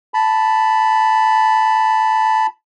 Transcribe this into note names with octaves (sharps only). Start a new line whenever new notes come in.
A5 B5